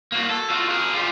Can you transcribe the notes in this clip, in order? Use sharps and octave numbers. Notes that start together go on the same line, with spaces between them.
A#3 F#4
A4
F4 F#4
G#4 A#4
F4 G4